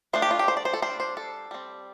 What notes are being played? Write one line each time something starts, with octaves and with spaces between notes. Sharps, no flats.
F3 A3 D4 C5
G4
F4
G4
C5
D5
C5
A4
G3 D4 C5
C5
A4
G3 C4